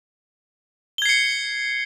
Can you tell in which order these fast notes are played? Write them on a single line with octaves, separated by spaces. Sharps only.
G7 G#6 C7 C#7